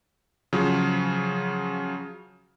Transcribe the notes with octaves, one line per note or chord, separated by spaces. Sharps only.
C#3 F3 F#3